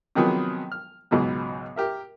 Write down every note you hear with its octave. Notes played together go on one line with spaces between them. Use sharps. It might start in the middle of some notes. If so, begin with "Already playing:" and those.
C3 D#3 F3 F#3 B3 G#4
F6
C#2 G#2 B2 F#3 B3
G4 A#4 E5